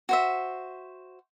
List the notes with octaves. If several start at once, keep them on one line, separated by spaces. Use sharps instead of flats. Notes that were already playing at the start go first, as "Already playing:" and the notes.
F#4 C5 E5